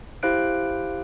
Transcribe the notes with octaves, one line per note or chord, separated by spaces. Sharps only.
E4 G4 C5 F5 F#6 D7